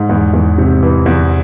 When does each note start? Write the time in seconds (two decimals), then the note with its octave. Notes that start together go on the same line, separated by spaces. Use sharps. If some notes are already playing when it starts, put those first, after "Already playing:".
Already playing: G#2
0.09 E2
0.34 E2
0.58 C3
0.83 E3
1.06 E2